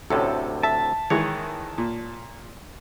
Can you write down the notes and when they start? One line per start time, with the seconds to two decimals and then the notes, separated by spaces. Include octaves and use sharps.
0.10 D2 A2 C3 C#4 A4
0.63 E5 A5
1.10 D#3 E3 G#3 C#5
1.78 A#2